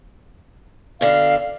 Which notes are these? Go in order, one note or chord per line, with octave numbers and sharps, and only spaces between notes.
B2 D3 F5